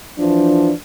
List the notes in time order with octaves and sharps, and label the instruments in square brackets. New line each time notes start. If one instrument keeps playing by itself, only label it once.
[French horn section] E3 F3 D4